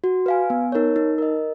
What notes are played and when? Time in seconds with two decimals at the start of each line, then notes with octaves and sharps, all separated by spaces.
0.04 F#4
0.26 B4 F5 G#5
0.50 B3
0.72 D#4 A#4 C#5
0.96 D#4
1.18 A#4 D#5